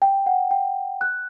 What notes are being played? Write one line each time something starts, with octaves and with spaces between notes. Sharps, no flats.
G5
F#5
G5
F#6